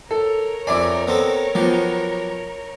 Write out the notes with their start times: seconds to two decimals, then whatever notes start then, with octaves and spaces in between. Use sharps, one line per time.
0.11 A4 A#4 C#5
0.67 F2 E4 D5 E5 G#5 D6
1.07 B3 C4 A4
1.55 F3 F#3 B3 G4